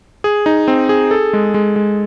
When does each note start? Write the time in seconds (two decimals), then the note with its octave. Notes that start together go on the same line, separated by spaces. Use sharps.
0.24 G#4
0.46 D#4
0.68 C4
0.89 G#4
1.11 A4
1.33 G#3
1.54 G#3
1.76 G#3